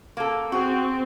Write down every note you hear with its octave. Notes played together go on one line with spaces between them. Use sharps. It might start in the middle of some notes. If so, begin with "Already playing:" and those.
A#3 A4
C4 F#4 G#4